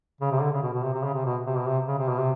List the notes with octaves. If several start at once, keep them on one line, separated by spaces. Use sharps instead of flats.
C#3
C3
D3
C#3
B2
B2
C3
C3
C#3
C3
B2
C3
B2
C3
C#3
C3
B2
C3